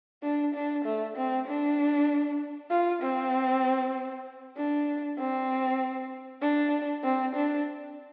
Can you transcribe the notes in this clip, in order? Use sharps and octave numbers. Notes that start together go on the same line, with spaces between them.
D4
D4
A3
C4
D4
F4
C4
D4
C4
D4
C4
D4